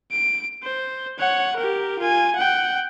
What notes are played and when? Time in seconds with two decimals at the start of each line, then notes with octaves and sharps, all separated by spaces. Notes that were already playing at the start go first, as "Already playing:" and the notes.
0.12 D7
0.63 C5
1.19 C#5 F#5
1.57 G4 A#4
1.99 F4 G#5
2.36 F#5 G5